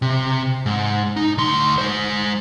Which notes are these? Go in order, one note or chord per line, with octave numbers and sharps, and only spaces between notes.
C3
G#2
D#4
D2 C6
G#3 C5